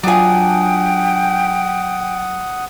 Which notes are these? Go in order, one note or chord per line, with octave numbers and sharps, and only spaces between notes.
F#3 D4 F4 G#4 F#5 G5 D#6